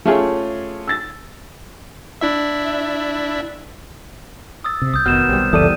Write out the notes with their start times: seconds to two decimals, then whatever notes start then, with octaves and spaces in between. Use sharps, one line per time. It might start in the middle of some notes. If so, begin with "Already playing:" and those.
0.06 A3 C#4 F4 G4 G#4 C#5
0.87 E6 A6
2.21 D4 E4 E5
4.64 D#6 E6 A6
4.82 C3
4.94 C2 D#6 G6
5.06 F1 B2 D#3 F6 E7
5.29 B1 C3 G3
5.53 F#1 C#2 E3 E4 A4 D5 D#6 D#7